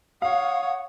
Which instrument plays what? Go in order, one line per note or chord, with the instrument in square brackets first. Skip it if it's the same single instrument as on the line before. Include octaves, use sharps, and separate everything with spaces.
[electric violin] C#5 D#6 [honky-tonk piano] F5 [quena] F#5